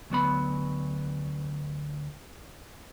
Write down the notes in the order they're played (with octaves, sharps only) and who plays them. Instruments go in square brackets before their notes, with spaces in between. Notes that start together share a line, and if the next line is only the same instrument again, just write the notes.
[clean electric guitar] D2 F#3 B3 B5